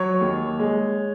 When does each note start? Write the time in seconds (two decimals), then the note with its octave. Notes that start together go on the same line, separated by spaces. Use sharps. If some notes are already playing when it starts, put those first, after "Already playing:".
Already playing: F#3 C#5
0.21 D#2
0.59 G#3